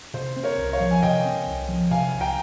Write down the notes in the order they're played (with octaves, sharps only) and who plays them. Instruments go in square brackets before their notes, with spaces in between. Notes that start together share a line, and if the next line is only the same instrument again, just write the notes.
[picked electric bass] C3 [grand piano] C5
[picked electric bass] C4
[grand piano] A#4 C#5
[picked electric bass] C2
[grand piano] C#5 F5
[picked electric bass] F3
[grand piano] G#5
[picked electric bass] C3 [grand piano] D#5 G5
[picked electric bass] C4
C2
F3
[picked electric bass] C3 [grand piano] F5 G#5
[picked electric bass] C2
[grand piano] G5 A#5